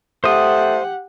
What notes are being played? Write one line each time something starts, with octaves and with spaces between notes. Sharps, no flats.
A3 G4 C5 F#5 D#6